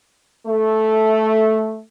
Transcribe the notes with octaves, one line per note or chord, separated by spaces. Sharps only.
A3